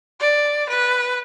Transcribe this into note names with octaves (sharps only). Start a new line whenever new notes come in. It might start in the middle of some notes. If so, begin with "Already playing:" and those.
D5
B4